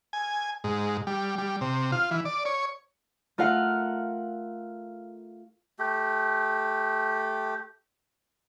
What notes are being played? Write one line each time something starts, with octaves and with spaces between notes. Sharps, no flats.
G#5
G#2
G3
G3
C3
F4
E3
D5
C#5
A3 F4 A#4 F5 F#5
A3 G4